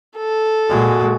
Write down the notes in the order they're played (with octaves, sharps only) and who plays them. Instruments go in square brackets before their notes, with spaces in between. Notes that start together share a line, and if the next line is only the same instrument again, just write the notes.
[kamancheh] A4
[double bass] A#2 G#3 [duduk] F#4